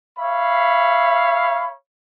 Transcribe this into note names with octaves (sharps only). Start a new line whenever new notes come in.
C#5 E5 F5 B5